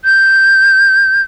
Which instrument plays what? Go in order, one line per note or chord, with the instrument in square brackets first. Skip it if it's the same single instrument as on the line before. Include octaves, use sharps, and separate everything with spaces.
[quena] G6